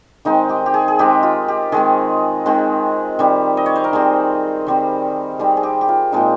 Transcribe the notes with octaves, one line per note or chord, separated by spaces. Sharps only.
D#3 G#3 C4 D#4
G4
G4
G#4
G#4
D#3 G#3 C4 G4
F4
G4
D#3 G#3 C4 G#4
D#3 G#3 C4
D#3 G3 C4
D#5
C#5
C5
A#4
D#3 G3 C4 G#4
D#3 G3 C4
D#3 G3 C4 G#4
G#4
G4
G4
F4
A#2 G#3 C4 D#4